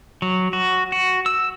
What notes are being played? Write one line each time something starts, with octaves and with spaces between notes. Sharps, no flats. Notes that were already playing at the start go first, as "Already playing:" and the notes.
F#3
F#4
F#4
E6